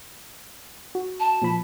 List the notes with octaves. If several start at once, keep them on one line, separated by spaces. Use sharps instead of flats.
F#4
A5
A#2 F3 B5